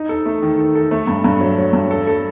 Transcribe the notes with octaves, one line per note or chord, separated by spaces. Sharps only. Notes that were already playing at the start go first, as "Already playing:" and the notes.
Already playing: D#4
A4
A3
D#3
A4
A4
A3
G2
G2
F#3
F#3
G2
A4
A4